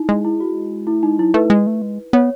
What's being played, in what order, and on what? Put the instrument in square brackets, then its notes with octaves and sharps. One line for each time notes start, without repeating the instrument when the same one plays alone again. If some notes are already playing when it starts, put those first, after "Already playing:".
Already playing: [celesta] D#4 E4
[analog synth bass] G#3
[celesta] E4
F#4
[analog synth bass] A3 [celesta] E4
[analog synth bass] G#3 [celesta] D#4
[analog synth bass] F#3 [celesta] E4
[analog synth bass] A3 [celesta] B4
[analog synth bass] G#3
A3
G#3
[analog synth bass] B3 [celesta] C#5